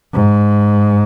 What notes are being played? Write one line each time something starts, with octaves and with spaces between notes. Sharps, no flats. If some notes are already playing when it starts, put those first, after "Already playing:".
G#2